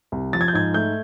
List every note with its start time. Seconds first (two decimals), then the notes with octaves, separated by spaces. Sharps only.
0.12 C2
0.33 F3 A6
0.41 G#6
0.48 G6
0.53 G#2 G#6
0.74 A3 G6